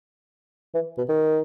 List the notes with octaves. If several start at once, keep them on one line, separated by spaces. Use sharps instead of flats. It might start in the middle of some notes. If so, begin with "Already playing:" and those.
E3
B2
D#3